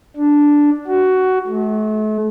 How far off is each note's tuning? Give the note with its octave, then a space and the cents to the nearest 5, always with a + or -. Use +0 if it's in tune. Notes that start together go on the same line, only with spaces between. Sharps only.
D4 -5
F#4 +15
A3 -40